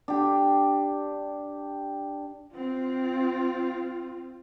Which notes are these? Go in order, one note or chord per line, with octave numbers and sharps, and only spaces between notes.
D4 G4
C4 F4